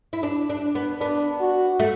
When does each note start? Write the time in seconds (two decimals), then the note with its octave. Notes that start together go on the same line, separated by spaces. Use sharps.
0.13 E4
0.23 D4
0.50 D4
0.75 B3
1.01 B3 D4
1.41 F#4
1.79 A3